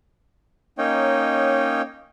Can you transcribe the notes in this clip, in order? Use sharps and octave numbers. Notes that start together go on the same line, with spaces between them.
A#3 C#4 D#4 C#5 D#5 G5